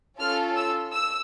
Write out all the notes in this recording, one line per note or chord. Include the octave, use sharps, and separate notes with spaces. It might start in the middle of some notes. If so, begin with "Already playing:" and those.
C#4 F4 A4 F6
E6
E6